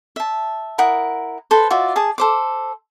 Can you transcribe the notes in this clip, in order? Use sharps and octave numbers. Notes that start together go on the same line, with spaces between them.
E5 A5
E4 A#4 F#5 D#6
A4 B4 C5
F4 F#4 D5 E5
G#4 A5 D#6
A4 C5 D6